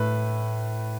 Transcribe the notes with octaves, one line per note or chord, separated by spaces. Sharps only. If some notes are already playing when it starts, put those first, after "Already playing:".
Already playing: A2 A3 B4